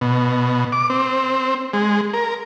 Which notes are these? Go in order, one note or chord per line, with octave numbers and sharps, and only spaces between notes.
B2
D6
C4
G#3
A#4